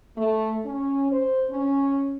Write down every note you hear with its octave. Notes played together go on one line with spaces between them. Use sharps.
A3
C#4
C5
C#4